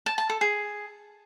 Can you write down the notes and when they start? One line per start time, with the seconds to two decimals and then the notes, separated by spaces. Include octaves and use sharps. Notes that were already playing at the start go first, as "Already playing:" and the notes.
0.06 A5
0.18 A5
0.29 A4
0.41 G#4